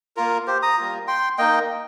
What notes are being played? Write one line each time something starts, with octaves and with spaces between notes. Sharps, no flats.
A#3 F4 A#4
G4 C5
A#5 D#6
G3 A#3 F4
G5 C6
A#3 D#4 D#5 G5